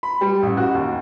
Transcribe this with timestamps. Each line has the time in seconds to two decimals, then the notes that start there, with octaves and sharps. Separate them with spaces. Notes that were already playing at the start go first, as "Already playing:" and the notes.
0.03 B5
0.21 G3
0.42 A1
0.57 F#4
0.75 D#2